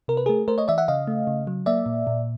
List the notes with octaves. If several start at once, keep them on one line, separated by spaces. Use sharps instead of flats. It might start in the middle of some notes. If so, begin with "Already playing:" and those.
C3 A#4
B4
A3 G#4 A#4
A3 A#4 C5
C#5 D#5
E3 D5 E5
E5 F#5
C#3 D#5 F5
A3
C#3
F#3
A#3 D5 E5
A#2
A#2